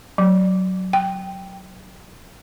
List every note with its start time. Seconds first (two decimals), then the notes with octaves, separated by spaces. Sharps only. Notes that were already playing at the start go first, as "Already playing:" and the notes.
0.18 F#3
0.93 G5